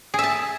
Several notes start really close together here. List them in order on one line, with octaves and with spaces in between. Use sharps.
G#4 E5 A5